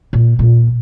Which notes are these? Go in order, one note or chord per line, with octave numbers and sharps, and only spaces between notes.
A#2
A#2